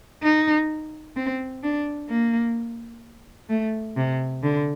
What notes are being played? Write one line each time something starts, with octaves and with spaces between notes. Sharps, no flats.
D#4
C4
D4
A#3
A3
C3
D3